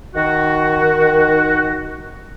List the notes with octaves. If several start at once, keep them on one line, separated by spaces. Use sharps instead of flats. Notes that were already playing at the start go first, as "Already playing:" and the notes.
D#3 F#4